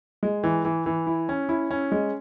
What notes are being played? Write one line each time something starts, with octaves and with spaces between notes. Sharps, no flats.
G#3
E3
E3
E3
E4
C#4
E4
C#4
G#3